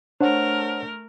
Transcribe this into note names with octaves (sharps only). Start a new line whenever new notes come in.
A3 D4 A#4 C5 C#5 F#5